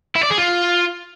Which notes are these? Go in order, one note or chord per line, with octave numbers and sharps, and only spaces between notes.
E4
D5
G#4
F4